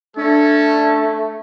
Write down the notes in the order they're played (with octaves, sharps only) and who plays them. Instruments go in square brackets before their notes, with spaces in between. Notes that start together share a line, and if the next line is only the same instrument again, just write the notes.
[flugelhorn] A3 [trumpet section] C#4 A4 [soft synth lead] D4